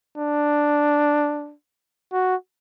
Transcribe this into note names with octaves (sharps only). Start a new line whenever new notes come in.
D4
F#4